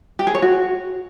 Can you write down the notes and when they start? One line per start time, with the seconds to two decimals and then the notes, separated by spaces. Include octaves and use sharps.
0.19 G4
0.27 G#4
0.35 C#5
0.42 F#4